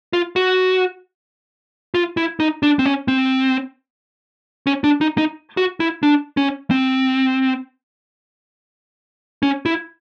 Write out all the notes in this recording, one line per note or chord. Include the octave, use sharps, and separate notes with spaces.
F4
F#4
F4
E4
D#4
D4
C4
C#4
C4
C#4
D4
D#4
D#4
F#4
E4
D4
C#4
C4
C#4
E4